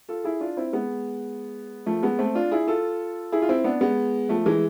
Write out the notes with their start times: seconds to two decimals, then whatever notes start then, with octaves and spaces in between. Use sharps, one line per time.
0.09 F4 A4
0.24 E4 G#4
0.41 D4 F4
0.57 C4 E4
0.73 G#3 B3
1.86 F3 A3
2.03 G#3 B3
2.19 A3 C4
2.35 D4 F4
2.51 E4 G#4
2.67 F4 A4
3.32 E4 G#4
3.42 F4
3.49 C4 E4
3.64 B3 D4
3.81 G#3 B3
4.29 F3 A3
4.46 E3 G#3